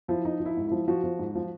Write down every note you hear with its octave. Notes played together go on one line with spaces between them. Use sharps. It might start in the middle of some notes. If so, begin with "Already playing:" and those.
F3 E4
F3 D#4
F3
E4
G#2
F3 E4
F3 F#4
F3
G#2
F3